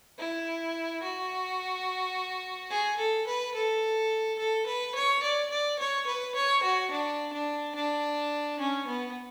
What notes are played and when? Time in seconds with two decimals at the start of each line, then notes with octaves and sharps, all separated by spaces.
0.19 E4
1.03 F#4
2.70 G#4
2.99 A4
3.27 B4
3.55 A4
4.39 A4
4.66 B4
4.95 C#5
5.23 D5
5.50 D5
5.79 C#5
6.07 B4
6.35 C#5
6.63 F#4
6.91 D4
7.33 D4
7.76 D4
8.59 C#4
8.87 B3